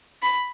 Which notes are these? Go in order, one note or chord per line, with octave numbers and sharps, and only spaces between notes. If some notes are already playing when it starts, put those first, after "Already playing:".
B5